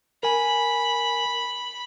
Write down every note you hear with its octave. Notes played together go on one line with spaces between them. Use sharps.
A#4 G#5 B5